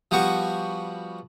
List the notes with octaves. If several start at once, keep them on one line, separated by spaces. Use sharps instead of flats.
F3 G3 B3 F#4 C#6